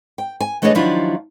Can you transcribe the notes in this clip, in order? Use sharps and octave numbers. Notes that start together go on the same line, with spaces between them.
G5
G#5
E3 A3 D4 G#4 C#5 D#5
D#3 F3 F#3 D4 E4 F4